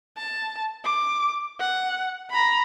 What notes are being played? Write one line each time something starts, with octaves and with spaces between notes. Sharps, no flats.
A5
D6
F#5
A#5 B5